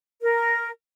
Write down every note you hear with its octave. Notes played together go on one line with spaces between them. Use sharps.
A#4